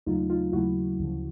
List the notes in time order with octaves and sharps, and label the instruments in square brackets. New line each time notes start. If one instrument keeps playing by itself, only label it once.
[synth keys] D#2 C#3 F#3 A3 D#4 F4
D#4 F4
D#2 C#3 F#3 A3 E4 F#4
D2 C#3 F3